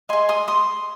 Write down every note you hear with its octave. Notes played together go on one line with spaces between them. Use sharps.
G#4 D#5 G#5 C6
C6 D#6
C6 D#6